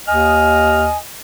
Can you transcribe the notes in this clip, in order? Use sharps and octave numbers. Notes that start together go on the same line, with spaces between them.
D#2 D#5 G#5 F6